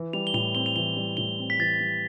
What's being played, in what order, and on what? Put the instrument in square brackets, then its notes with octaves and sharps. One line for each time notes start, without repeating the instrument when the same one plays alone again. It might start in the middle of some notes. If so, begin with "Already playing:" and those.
Already playing: [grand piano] E3
[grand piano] G3 [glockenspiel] F7
[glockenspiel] G7
[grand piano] A2 [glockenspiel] F7
[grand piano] C4 [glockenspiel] G7
[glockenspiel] F7
[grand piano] E3 [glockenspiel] G7
[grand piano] G3
[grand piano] A2 [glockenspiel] G7
[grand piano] C4
[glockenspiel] B6
[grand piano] E3 [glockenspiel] A6
[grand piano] G3